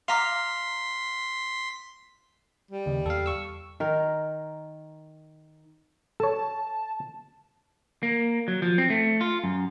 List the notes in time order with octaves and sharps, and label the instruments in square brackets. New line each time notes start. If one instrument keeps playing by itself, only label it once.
[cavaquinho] F5 A#5 D6 [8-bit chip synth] C6 B6
[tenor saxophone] G3
[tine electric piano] D#2 [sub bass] C#3
[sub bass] E2 [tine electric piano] A4 F5
[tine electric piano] C#6 E6
[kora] D#3 A#4
[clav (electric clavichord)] A4 C#5 [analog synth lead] A5
[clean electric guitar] A#3
F#3
F3
C4
A3
F4
F#2